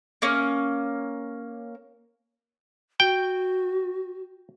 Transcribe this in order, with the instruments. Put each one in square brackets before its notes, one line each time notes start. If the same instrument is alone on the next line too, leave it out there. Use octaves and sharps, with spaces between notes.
[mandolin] A#3 C#4
[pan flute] F#4 [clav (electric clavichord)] G5